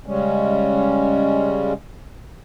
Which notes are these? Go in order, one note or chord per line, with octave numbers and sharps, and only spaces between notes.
C#3 G3 G#3 C#4